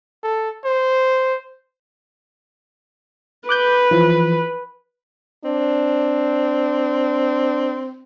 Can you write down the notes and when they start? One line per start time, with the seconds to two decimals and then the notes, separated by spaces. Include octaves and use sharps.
0.24 A4
0.65 C5
3.49 B4 D6 F#6 G6
3.91 E3 F3
5.45 C4 D4